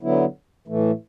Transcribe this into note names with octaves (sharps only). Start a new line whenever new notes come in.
D3 F#3 B3 E4
A2 E3 A3